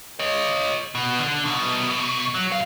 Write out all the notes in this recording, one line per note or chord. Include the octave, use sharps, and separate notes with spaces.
C#5 D#5
B2
D3
C2 B2
F#3
F#2 F5